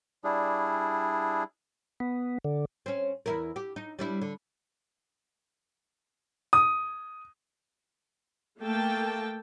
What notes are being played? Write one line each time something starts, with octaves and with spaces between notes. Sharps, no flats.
G3 D4 E4 G#4
B3
D3
C4 C#4
E2 E4 A#4
G4
D#4
G3 D4 E4
D3
D#6
A3 A#3 A4 G5 A5